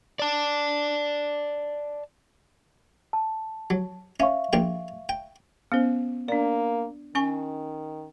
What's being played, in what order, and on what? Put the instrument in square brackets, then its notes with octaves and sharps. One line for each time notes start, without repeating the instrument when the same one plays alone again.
[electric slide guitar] D5 A5
[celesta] A5
[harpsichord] F#3
[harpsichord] C#4 [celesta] E5 F5 C#6
[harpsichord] A#1 A#2 G5
G5
[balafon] B3 C#4 C5
[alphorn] A#3 [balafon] D4 D5
[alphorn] D#3 [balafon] C#4 G#5 C#6